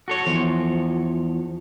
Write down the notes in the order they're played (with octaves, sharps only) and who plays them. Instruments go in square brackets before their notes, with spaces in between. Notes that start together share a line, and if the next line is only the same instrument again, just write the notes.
[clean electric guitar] F#4 A4 C#5
E2 F3